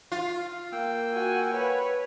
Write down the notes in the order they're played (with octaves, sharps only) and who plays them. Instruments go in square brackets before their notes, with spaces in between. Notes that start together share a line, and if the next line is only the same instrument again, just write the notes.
[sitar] F4
[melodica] A#3 G5 E6
[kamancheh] F#4 G#5
B4 C#5